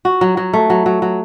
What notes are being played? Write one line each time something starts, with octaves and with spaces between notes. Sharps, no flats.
F#4
F#3
F#3
A3
F#3
F#3
F#3